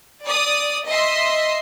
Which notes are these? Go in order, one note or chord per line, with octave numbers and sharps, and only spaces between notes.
D5 D#6
D#5 E5 C6